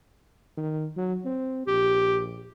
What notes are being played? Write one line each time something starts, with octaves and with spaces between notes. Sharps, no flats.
D#3
F#3
C4
A#1 G4